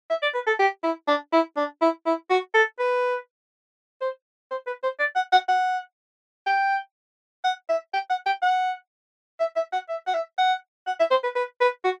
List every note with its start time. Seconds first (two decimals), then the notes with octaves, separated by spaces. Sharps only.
0.10 E5
0.23 D5
0.35 B4
0.47 A4
0.59 G4
0.84 E4
1.08 D4
1.33 E4
1.57 D4
1.82 E4
2.06 E4
2.30 F#4
2.55 A4
2.79 B4
4.02 C5
4.51 C5
4.67 B4
4.83 C5
5.00 D5
5.16 F#5
5.32 F#5
5.49 F#5
6.47 G5
7.44 F#5
7.69 E5
7.94 G5
8.10 F#5
8.26 G5
8.42 F#5
9.40 E5
9.56 E5
9.73 F#5
9.89 E5
10.07 F#5
10.14 E5
10.38 F#5
10.87 F#5
11.00 E5
11.11 C5
11.24 B4
11.36 B4
11.61 B4
11.85 F#4